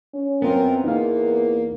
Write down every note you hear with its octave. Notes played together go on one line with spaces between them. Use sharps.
C#4
F#2 B3 C4 F4 A#4
E2 A#3 D#4 A#4 F5